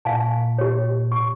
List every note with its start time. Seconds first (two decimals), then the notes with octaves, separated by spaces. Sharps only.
0.05 A#2 F5 G#5 A5
0.58 G4 C#5
1.12 C#6